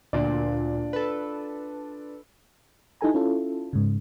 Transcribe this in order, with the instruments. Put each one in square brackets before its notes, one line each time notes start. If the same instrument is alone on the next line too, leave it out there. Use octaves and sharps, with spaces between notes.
[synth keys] D2 A#2 [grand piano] D4 F4 D5
[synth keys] A4 B4
[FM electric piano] D#4 E4 G4 A4 G#5 A#5
C#4 E4 F4 A4
G#2 C#3